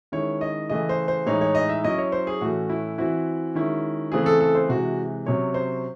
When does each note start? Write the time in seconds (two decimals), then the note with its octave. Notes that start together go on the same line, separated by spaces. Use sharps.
0.12 D#3 G#3 C#4 E4 C#5
0.41 D#5
0.69 C#3 E3 A3 D#5
0.89 C5
1.08 C5
1.26 A2 E3 G#3 D#4 C#5
1.41 C#5
1.55 D#5
1.69 E5
1.84 F#3 C#4 E4 D#5
1.98 C#5
2.12 C5
2.27 G#4
2.41 A2 E3 A3 C#4 F#4
2.70 E4
2.98 E3 C4 E4 F#4
3.55 D#3 G#3 C#4 E4
4.12 C#3 E3 A3 C4 G#4
4.26 A4
4.41 A4
4.55 C5
4.69 C3 E3 G#3 F#4
5.26 C3 F#3 C#4 C#5
5.54 C5